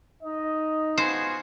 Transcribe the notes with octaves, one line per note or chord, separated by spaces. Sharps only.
D#4 D#5
B3 F4 F#4 G#4 C5